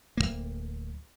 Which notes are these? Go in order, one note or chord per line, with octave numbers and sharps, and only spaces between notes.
D1 F2 A#3